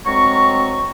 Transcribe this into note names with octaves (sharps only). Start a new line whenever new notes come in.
D2 F#3 G#3 C4 A#5 C#6